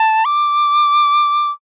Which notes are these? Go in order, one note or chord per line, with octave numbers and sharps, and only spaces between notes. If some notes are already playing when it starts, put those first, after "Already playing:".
Already playing: A5
D6